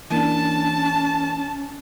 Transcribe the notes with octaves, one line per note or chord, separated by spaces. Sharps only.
E3 A#3 C#4 D4 A5